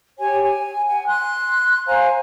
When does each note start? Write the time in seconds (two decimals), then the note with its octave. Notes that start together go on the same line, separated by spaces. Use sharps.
0.19 G4 C#5 G#5
0.41 G#5
0.86 F#5 G#5
1.06 C6 F#6
1.88 C5 F5 G#5 A#5